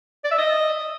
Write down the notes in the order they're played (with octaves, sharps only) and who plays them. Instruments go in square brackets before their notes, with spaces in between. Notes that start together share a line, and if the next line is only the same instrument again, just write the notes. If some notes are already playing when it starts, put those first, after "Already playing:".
[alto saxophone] D5
E5
D#5